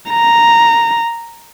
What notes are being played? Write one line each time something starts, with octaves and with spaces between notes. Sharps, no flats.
A#5